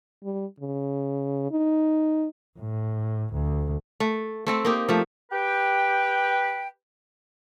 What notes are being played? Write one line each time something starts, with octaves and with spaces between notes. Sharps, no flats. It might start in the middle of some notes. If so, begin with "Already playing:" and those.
G3
C#3
D#4
A2
D2
A3
A3 C4 A4
A#3 D#4 G4
F3 A3
G4 B4 G5